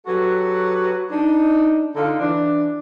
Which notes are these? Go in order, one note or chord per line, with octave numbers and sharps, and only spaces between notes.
F#3 F#4 G4 A4 B4
D4 D#4
D3 D#4 F4 A4
E3 D4